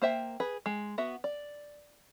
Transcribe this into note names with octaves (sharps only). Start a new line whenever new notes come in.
A#3 C5 E5 G5
G#4 B4
G#3
B3 F#4 E5
D5